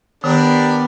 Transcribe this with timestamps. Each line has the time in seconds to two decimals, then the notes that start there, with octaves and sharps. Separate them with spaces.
0.24 D#3 B3 D4 G4 A#4